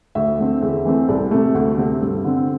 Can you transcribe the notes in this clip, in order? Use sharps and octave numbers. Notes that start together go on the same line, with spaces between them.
D2 E5
D3 A3 C4
E2
E3 A3 C4
C2 D5
C3 A3
D2
C3 A3 C4
G2
D3 C4